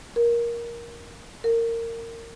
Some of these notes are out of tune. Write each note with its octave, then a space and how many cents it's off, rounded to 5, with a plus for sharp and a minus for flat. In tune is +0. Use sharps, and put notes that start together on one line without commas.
A#4 +15
A#4 -20